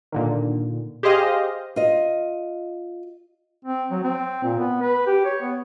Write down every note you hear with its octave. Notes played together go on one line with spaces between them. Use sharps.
A#2 D3 D#3
G4 G#4 C5 D#5 F5
F4 D#5
C4
F#3
C4
A#2
B3
B4
G4
C#5
B3